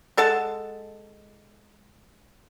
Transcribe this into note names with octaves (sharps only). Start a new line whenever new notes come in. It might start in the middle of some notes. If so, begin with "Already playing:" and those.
G#3 A4 F#5 A5